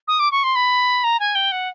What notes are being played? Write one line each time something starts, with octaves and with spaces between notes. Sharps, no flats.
D#6
D6
C#6
C6
B5
A#5
G#5
G5
F#5